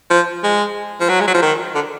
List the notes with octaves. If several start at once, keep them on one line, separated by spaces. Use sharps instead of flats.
F3
G#3
F3
F#3
G#3
F#3
F3
D#3
D3